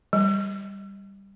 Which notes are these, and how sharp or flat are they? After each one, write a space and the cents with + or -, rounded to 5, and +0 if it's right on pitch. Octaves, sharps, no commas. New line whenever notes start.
G3 +10